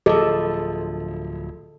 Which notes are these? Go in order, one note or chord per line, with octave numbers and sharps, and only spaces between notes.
D1 F3 G#4 A4 D#5